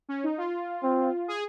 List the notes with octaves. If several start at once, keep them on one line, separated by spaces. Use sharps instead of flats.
C#4
D#4
F4
C4
G#4